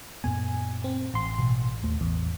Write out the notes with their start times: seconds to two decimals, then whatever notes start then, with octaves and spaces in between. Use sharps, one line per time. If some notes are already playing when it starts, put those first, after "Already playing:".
0.24 F#2 A#2 B3 G#5
0.84 C4
1.14 A1 C6
1.38 A1 B2
1.83 D#2 A3
2.01 A1 E2